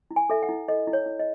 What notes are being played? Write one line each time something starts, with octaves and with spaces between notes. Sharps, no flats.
E4
G#5
A4 E5
F#5
E4
A4 D#5
E4
C#5
E4
D#5